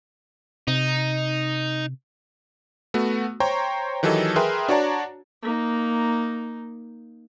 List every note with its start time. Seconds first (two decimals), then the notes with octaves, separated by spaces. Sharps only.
0.68 C3 D#4
2.94 A3 B3 F#4
3.40 C5 C#5 G5 A#5 C6 C#6
4.03 D#3 E3 F#3 G4 A4 D#5
4.36 G#4 A#4 B4 E5 G5 C6
4.68 D4 F#4 C#5 D5 A5 A#5
5.42 A#3 D#4